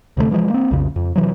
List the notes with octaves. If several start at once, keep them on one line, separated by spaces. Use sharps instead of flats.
D2 C3 F#3 A3
E3 F3 G#3
A#3 C4
B1 F2 C#3
F2
C3 E3 F#3